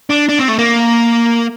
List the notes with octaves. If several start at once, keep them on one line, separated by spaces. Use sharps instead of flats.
D4
D4
C4
A3
A#3